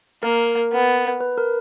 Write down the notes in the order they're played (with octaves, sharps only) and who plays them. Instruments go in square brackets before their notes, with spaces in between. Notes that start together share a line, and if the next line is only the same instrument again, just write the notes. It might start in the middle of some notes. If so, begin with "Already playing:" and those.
[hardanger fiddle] A#3 [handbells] A#4
[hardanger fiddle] B3
[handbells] B4
A#4